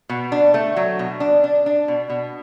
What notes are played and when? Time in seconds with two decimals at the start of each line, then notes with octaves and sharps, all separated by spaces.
0.09 B2
0.32 D4
0.54 A3
0.76 F#3
0.99 B2
1.20 D4
1.44 D4
1.66 D4
1.88 B2
2.10 B2